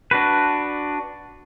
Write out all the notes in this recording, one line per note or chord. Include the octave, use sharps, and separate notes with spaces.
D4 F#4 B4